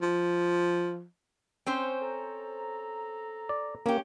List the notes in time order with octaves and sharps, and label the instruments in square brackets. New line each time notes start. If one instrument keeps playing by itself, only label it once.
[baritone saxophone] F3
[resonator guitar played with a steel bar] C4 C#4 C5
[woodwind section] A4 A#5
[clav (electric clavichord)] D5
[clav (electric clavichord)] A#3 [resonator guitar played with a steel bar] C#4 G4